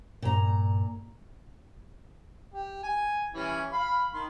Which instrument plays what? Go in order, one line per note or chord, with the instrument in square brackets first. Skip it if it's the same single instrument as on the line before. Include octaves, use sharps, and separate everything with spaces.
[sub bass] G2 [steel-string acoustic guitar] A#2 A#5
[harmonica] G4
G#5
E3 G3 C#4
F5 B5
D#3 C6